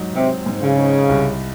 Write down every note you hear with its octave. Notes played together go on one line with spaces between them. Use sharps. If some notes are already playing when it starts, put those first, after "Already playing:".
Already playing: G#2 F#3 D#4
C3 C4
G#2
C#3
D#4
C2